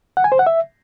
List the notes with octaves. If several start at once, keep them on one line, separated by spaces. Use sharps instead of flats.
F#5
G#5
C5
F#5
E5